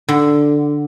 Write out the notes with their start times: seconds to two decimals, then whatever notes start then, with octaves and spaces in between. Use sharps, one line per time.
0.08 D3